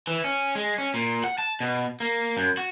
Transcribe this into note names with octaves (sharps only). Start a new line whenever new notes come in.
E3
C#4
G#3
C#4
A#2
F#5
A5
B2
A#3
F#2
F#4